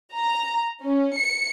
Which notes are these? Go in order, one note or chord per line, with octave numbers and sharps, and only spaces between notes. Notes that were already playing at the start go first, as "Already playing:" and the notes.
A#5
C#4
C#7